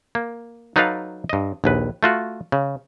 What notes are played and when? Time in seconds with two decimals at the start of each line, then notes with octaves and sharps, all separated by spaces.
0.15 A#3
0.76 F#3 D#4 A4 B4 D5 F5
1.29 G2 D#5
1.64 A#1 D#2 B4
2.03 A3 F4 F#4
2.52 C#3